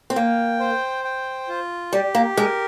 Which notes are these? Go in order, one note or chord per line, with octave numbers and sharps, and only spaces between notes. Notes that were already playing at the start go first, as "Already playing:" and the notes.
C4
A#3 G5
C5
G5
F4
G3 G4
A#3
G#3 A#4